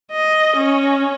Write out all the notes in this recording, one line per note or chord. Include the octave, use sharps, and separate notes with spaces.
D#5
C#4